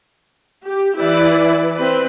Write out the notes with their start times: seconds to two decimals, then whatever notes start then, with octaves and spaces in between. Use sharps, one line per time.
0.66 G4
0.98 E3 E4 B4 D5
1.76 C4 B4